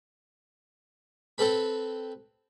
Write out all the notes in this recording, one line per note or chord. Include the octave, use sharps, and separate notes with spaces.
C4 A4 B4 B5